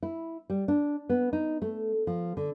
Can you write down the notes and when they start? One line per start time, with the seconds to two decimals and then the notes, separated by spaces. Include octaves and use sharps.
0.03 E4
0.50 G3
0.68 D4
1.09 B3
1.33 D#4
1.62 A3
2.07 F3
2.37 D3